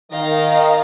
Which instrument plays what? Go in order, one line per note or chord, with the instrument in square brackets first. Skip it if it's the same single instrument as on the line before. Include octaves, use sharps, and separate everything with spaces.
[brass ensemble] D#3 [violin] D#5 F5